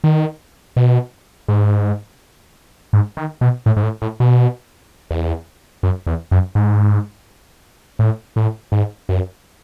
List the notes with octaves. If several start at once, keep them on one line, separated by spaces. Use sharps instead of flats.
D#3
B2
G#2
G#2
D#3
B2
A2
G#2
A2
A2
B2
E2
F#2
E2
F#2
G#2
A2
A2
G#2
F#2